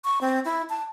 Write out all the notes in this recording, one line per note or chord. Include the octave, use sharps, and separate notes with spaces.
C#6
C4
E4
A5